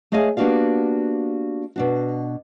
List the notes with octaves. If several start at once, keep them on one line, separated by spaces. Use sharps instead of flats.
A3 G#4 C#5 D#5 F5 G#5
A#3 B3 D4 F#4 G4 F5
B2 D4 F#4